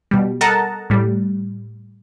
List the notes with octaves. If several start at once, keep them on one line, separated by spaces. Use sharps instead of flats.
B2 G3
A4 A#4 D#5 F#5 A5 A#5
A2 G3